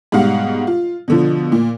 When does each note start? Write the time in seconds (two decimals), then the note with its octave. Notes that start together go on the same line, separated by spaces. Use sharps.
0.12 G#2 B2 G3 F5 F#5
0.67 F4
1.08 B2 D3 F3
1.52 A#2